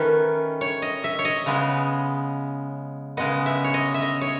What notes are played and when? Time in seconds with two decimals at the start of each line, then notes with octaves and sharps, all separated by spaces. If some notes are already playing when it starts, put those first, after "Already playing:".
Already playing: D#3 A3 C#4 B4
0.61 C#5
0.82 D#5
1.04 E5
1.19 C#5
1.25 D#5
1.46 C#3 G#3 B3
3.17 C#3 G#3 B3 D#5
3.46 E5
3.64 C#5
3.74 D#5
3.94 E5
4.02 D#5
4.21 C#5